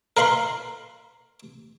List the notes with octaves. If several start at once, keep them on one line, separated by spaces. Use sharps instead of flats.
A#4 B4 F5 B5 C6